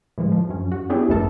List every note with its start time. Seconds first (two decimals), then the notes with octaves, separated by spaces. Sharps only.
0.18 A2 E3 F3 G#3
0.32 F3
0.49 F#2 C#4
0.72 F#4
0.90 B3 C#4 D4 E4 G4 G#4
1.08 A1 F#2 A3 B3 A4 A#4